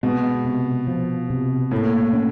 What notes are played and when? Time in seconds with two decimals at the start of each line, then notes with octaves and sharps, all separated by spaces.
0.03 B2 G#3
0.45 C3
0.87 F3
1.30 C3
1.71 A2 A#3
2.13 C#4